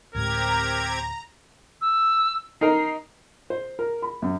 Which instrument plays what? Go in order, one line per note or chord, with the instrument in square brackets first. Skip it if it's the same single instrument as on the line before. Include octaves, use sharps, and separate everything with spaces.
[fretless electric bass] D2 A2 G#3 [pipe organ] C4 G4 G#6 [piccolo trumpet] A#4 [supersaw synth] A#5
[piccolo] E6
[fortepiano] D#4 A#4 [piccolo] C7
[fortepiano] C5
A#4
B5
F#2